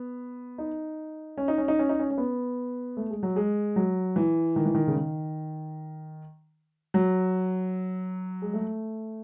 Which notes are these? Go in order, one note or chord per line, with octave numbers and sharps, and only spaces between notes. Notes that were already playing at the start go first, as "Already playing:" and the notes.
Already playing: B3
D#4
C#4
D#4
C#4
D#4
C#4
D#4
C#4
C#4
B3
A3
G#3
F#3
G#3
F#3
E3
D#3
E3
D#3
C#3
D#3
F#3
G#3
A3